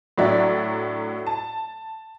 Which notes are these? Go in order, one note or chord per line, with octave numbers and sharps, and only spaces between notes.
A2 F#3 D4 F#4 D5 E5
A5